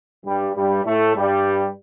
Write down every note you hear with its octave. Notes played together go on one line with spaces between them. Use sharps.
G2 G3
G2 G3
A2 A3
G2 G3